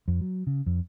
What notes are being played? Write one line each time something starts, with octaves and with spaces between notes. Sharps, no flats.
F2
F#3
C#3
F2